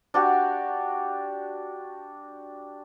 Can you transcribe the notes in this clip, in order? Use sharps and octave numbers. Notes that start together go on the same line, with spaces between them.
D4 F#4 G4